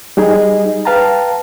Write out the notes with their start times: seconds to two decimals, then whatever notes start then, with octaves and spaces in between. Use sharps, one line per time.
0.17 G3 D#4 G#4 D#5
0.85 B4 F5 G5 A5 A#5